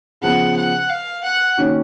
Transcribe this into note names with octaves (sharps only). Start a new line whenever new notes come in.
C#3 F3 B3 F#5
F#5
F5
F#5
D#3 A#3 C#4 F#4 C#5